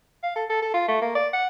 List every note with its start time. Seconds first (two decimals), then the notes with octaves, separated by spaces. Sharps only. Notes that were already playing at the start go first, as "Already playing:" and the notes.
0.23 F5
0.36 A4
0.50 A4
0.62 A4
0.74 F4
0.88 A3
1.02 A#3
1.15 D5
1.33 F#5